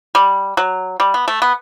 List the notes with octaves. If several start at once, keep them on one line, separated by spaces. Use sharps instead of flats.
G3
F#3
G3
B3
A3
B3